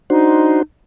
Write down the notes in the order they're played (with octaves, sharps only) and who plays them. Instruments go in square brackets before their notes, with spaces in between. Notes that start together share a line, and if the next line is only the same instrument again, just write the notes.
[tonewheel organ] D4 F#4 C5 [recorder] D#4